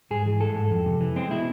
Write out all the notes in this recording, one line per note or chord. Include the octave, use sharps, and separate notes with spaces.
G#2 G#4
E3
G#3 A4
G#2
F2
C3
E3
G#3 C4
B2 E4